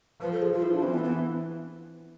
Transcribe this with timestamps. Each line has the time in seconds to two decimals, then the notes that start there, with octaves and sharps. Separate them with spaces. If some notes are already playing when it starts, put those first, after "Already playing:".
0.21 F3 B4
0.32 A4
0.42 G#4
0.53 F3 F4
0.63 E4
0.72 D4
0.83 E3 C4
0.94 B3
1.04 B3